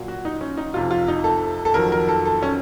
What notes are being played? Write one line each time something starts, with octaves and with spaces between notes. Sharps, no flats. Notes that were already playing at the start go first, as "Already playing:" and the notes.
Already playing: A#2 F#3
F#4
D#4
C#4
D#4
F2 C3 F3 F4
F4
D#4
A4
A4
F2 D#3 F#3 A#4
A#4
A4
A4
C#4